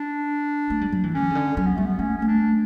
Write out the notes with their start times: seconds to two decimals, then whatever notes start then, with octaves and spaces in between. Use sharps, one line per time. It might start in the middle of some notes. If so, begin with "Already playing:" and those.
Already playing: D4
0.70 A3
0.81 G3
0.92 F#3
1.04 E3
1.14 D3 C#4
1.30 C#3
1.35 D3
1.57 F#3 C#4
1.66 B3
1.76 G3 A3
1.86 B3
1.99 A3 C#4
2.17 C#4
2.22 A3
2.27 D4